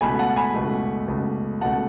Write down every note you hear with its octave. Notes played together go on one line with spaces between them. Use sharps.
C#2 B2 A3 G#5 B5
F#5 A5
G#5 B5
C#2 B2 A3
C#2 B2 A3
C#2 B2 A3 F#5 A5